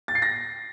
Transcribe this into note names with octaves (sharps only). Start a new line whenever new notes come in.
A6
C7
A#6